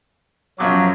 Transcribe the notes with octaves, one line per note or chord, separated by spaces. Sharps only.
F#2 F3 F#3 D6